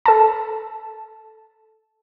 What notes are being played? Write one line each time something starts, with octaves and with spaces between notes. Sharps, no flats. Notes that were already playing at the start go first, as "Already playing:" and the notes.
A4 A5